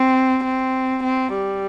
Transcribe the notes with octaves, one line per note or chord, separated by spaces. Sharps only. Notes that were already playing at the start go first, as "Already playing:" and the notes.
Already playing: C4
C4
C4
G3